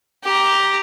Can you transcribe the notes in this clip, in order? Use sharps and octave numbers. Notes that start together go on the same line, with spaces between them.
G4 A#5